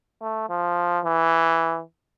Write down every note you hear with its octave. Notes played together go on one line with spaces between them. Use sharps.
A3
F3
E3